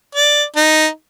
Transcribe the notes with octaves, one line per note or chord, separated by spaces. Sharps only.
D5
D#4